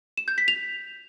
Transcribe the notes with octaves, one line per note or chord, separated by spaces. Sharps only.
E7
G6
B6
F7